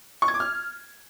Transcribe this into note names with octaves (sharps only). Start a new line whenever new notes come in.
C#6
G#6
D6
F6